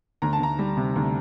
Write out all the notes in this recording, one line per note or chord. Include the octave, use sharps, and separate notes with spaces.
D2 A#5
A5
D2 A#5
G3
C3
D2